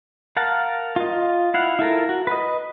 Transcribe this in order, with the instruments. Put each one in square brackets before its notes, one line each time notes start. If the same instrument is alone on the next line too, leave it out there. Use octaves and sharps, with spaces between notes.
[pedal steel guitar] A#4 F5 F#5 A5
F4 D#5
E4 F5 F#5
E4 F4 A4 A#4
F#4
B4 D#5